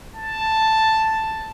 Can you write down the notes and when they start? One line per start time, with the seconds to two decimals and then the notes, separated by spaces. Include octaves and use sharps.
0.16 A5